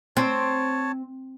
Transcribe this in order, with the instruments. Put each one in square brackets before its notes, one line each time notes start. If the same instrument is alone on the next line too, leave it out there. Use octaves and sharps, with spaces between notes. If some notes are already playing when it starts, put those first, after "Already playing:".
[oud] C4 [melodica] C#5 A5